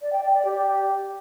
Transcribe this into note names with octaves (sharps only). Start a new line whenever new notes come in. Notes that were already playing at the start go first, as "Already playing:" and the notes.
D5
G5
D5
D5
G4